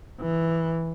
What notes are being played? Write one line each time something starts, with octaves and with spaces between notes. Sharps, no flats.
E3